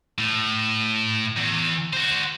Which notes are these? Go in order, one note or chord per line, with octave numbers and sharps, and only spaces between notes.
A2
E2
F#4 C5